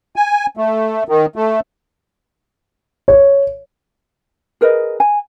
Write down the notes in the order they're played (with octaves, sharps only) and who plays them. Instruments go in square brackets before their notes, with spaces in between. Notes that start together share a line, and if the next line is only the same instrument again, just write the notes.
[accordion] G#5
A3
D#3
A3
[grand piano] C#5
[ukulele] G#4 A#4 B4 D#5
G#5